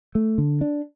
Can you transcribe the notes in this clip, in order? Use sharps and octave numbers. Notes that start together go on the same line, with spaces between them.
A3
D3
D4